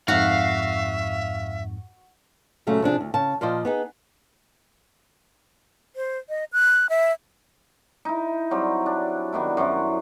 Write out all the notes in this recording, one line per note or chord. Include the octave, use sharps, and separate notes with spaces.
F2 G#2 F#4 E5 F5
A#2 C#3 F#3 A3
C3 F3 D4 G#4
D2
C#3 A5
A#2 F3 C5 D5 D#5
B3 D#4 G#4
C5
D#5
F#6
E5
D#4 E4
F#3 G3 C4
D4
D#3 B3 D4 E4
F#2 F#3 C4 E4